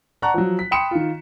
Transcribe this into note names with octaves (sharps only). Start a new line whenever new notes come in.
D5 F#5 A5 A#5 C#6 F#6
F3 F#3
B6
G5 B5 C6 D#6 C#7 E7
D#3 F4